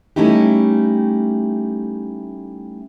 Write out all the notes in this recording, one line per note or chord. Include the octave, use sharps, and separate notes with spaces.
G3 A3 C#4 D#4 E4 G4